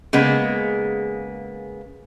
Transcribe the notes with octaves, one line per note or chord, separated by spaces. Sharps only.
C#3 G#3 A#3 B3